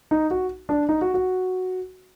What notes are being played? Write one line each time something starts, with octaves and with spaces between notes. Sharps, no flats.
D#4
F#4
D4
D#4
F#4
F#4